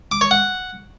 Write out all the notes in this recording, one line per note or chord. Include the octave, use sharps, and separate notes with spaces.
D6
C#5
F#5